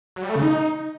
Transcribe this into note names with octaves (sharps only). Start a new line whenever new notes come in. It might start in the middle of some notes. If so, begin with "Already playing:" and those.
F#3
G3
A3
C#3
D#4